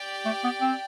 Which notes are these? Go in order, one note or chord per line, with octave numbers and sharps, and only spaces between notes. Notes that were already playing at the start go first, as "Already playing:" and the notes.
Already playing: G4 D5 G5
A3
B3
C4